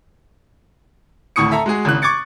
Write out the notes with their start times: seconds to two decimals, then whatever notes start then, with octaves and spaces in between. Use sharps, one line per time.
1.36 G#1 D2 A2 C#6 D#6 C#7
1.51 A4 E5 A#5
1.66 G#3 F#4 G#4
1.85 G#1 C#3 E3 F#6
2.02 C#6 D6 G#6 A6 C#7